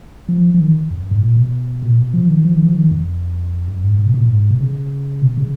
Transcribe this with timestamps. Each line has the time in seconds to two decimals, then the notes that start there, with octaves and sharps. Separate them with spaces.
0.29 F3
0.54 F3
0.60 D#3
0.90 F2
1.01 F#2
1.11 G#2
1.21 A#2
1.36 B2
1.82 A#2
1.98 B2
2.14 F3
2.29 D#3
2.45 F3
2.54 D#3
2.65 F3
2.76 D#3
2.91 F2
3.68 F#2
3.83 G#2
3.99 G#2
4.07 B2
4.14 A#2
4.29 G#2
4.51 B2
4.60 C#3
5.22 B2
5.37 C#3